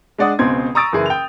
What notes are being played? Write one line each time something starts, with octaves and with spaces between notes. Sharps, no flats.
G#3 D4 D5 F#5 D#6
C#2 B2 C4 C6 G#6
A#5 C#6 D#6 E6 A6 D7
F#1 E3 G#4
G5 F7